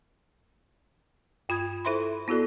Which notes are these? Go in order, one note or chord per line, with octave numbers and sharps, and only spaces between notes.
G2 F4 B5 D#6 G#6
E4 A4 C5 E5 B5 C6
B3 E4 F#4 A4 D5